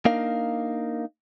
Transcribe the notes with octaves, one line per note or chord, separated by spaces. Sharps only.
A#3 D4 D#4 A#4 F5